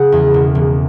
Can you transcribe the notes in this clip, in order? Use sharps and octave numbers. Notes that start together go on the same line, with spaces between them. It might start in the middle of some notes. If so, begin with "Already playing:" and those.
Already playing: C#3 F#5
E2
E1
E1